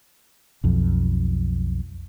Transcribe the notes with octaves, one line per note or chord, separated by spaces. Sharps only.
B1 F2